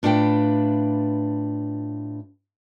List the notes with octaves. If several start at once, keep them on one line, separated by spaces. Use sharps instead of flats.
A2 D4 F4 B4 G5